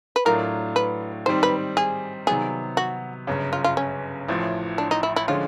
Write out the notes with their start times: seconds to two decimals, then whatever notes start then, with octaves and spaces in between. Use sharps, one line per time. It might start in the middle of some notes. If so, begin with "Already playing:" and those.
0.16 B4
0.25 A2 F#3 A3 D4 F4 A#4
0.76 B4
1.26 G#2 D#3 G3 C4 C5
1.43 B4
1.77 G#4
2.27 C3 D#3 F#3 B3 G#4
2.77 F#4
3.27 G1 F#2 C#3
3.53 F4
3.64 F4
3.77 C#4
4.28 A1 A2 F3
4.78 D4
4.91 D#4
5.03 E4
5.16 E4
5.28 D3 F3 G#3 C#4 F4